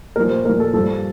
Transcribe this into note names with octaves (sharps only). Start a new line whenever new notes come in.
A#2 F3 A#4
C5
A#2 F3 A#4
A4
G2 F3 A4